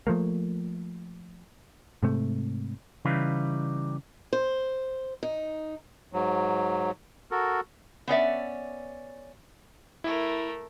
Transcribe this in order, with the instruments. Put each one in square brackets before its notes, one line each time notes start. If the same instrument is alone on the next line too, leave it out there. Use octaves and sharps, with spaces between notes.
[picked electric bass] F3 A3 A#3
G#2 C3 A3
[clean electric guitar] C#3 E3 G3 D#4 B4 F5
[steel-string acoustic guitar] C5
D#4
[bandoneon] G#2 F#3
F#4 A4 A#4
[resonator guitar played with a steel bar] B3 C#4 D5 E5
[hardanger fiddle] A3 A#4 [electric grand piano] E4